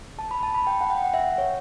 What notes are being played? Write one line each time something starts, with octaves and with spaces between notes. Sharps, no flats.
A5
B5
A5
B5
G5
F#5
G5
F#5
E5
C#5